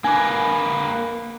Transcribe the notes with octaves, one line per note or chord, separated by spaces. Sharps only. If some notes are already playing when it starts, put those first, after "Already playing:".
A#3 D4 B4 D6